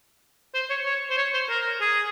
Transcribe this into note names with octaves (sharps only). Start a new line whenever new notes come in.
C5
C#5
C#5
C5
C#5
C5
A#4
G#4